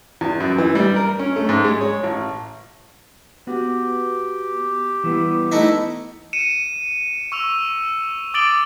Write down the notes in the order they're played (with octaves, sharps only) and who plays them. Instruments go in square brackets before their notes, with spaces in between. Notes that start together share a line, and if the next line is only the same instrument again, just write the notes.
[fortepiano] E2
F#2
E3
G3
A#4
C#4
A3
G#2
G#3
C#5
A1
[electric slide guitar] B3 F#4 [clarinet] G4
[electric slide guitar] E3 G3 B3
[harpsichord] A3 D#4 E4 [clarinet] F#5
[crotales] C#7 D#7 E7
C#6 E6 F7
D6 D#6 A6 D7 F#7 G7